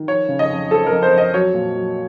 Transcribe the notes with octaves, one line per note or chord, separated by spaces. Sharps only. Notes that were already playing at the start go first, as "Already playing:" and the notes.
Already playing: D#3
F3 C#5
C#3
D#5
F2
F3 A4
A#4
F2
C5
F2
D#5
F#3 C#5
A#2
F#3